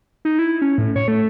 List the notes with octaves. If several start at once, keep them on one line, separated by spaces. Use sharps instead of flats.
D#4
E4
C#4
A2
C#5
A3